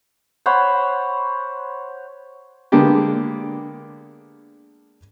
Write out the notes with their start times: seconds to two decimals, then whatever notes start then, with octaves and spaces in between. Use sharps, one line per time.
0.46 C5 C#5 F#5 B5
2.72 D3 G#3 A#3 B3 D4 G4